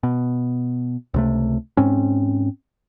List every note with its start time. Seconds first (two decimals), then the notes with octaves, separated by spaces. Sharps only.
0.03 B2
1.14 C#2 C3 A3
1.77 G#2 C4 C#4